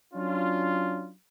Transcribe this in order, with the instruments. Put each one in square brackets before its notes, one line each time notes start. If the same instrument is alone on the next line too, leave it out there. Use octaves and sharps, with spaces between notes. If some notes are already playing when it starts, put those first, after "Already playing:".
[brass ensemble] F#3 C#4 D4 F4